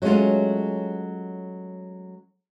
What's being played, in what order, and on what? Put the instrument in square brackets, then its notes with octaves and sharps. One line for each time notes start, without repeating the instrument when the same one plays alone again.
[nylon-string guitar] F#3 G#3 A3 C#4 F4